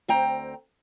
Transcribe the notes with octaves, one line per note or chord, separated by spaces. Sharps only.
D2 C4 G5 A#5